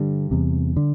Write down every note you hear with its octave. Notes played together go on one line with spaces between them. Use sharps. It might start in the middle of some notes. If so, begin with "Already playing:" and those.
Already playing: G2 D3 G3
E2 C3
D3